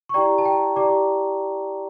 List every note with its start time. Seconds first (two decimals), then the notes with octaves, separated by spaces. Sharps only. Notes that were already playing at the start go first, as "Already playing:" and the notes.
0.09 C#6
0.14 E4 G4 D5 G5 A#5
0.38 A5
0.45 G5 A#5
0.76 E4 G4 D5 A#5 D6